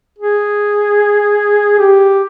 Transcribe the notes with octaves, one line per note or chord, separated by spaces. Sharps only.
G#4
G4